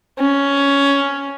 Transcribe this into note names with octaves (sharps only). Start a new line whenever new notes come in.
C#4